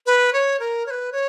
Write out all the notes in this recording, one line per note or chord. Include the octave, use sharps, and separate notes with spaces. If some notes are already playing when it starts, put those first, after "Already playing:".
B4
C#5
A#4
C#5
B4
C#5